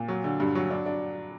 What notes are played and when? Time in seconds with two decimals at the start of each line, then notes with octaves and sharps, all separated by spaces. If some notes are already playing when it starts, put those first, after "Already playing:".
Already playing: A#2
0.08 F#3
0.24 D3
0.40 G2
0.55 F#3
0.70 D4
0.86 D4